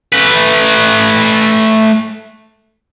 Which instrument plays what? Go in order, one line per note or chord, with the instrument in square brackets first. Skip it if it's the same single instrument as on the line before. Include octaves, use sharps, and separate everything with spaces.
[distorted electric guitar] A3 B4